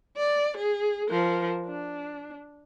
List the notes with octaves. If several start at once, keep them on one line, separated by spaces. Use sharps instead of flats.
D5
G#4
F3 A#4
D4